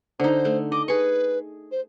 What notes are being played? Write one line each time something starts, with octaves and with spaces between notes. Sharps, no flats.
D3 D#4 C5
A3
D#5 D6
G#4 B4 C#6
C5